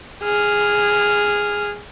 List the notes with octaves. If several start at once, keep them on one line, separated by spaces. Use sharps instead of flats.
G#4 F6